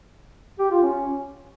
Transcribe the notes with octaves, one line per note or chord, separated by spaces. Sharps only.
G4
F4
C#4